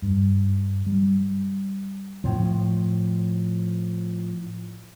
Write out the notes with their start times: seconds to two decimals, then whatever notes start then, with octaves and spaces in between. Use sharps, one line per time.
0.02 G2
0.86 G3
2.24 A2 F3